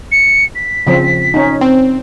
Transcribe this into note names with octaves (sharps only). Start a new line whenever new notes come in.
C#7
B6
C#3 F3 C4
C#4 D#4
C4